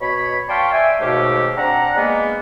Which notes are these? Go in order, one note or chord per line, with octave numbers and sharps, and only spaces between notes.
B2 C#5 B5
D5 F5 G5 A5 C6 C#6
E5 G5 G#5
D#2 G#2 B2 A3 G4 F5
C4 D4 F#5 A#5
G#3 A#3 B3